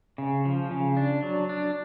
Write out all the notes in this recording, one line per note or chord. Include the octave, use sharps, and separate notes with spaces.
C#3
F3
C#3
D4
F#3
D4